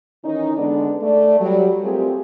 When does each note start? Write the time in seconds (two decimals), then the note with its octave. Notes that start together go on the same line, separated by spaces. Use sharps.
0.24 D#3 E3 C#4 D#4
0.57 D3 G#3 B3 D4 D5
1.02 A3 D5
1.41 F#3 G3
1.83 A3 C4 F4 G4 G#4 A#4